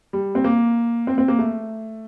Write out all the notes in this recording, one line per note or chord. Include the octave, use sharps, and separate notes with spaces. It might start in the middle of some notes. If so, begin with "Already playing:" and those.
G3
C4
A#3
C4
C4
A#3
A3